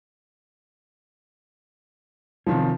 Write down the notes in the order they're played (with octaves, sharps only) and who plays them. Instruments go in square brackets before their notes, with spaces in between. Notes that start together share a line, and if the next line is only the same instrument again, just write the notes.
[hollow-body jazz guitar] C3 D#3 C#4 [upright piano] F3